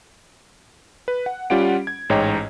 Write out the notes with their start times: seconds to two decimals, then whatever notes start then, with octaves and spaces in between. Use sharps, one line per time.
1.08 B4
1.26 F#5
1.50 G3 C#4 F4 G4 F#5 D7
1.87 G#6
2.09 A1 G#2 C#5 D#5 G5 A#5